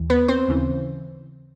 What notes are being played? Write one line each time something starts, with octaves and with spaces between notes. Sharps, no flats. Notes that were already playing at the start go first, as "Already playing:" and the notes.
Already playing: D#2 E3
B3 B4
C4 C5
D#2 C#3 E3